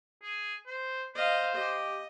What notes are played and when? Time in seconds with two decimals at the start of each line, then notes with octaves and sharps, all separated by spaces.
0.23 G#4
0.67 C5
1.15 C5 D#5 F5
1.55 G4 D#5